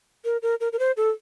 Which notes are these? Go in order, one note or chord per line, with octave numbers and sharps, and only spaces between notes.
A#4
A#4
A#4
A#4
C5
A4